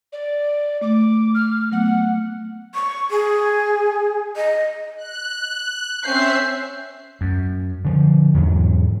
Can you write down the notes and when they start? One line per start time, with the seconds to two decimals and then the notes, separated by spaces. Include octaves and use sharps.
0.12 D5
0.81 A3 D6
1.34 F6
1.72 F#3 A3 B3 F#5
2.74 C#6
3.10 G#4
4.36 D#5
4.97 F#6
6.04 C4 C#4 E5 G6 C7
7.21 F#2
7.85 D3 F3
8.34 E2 G#2 F#3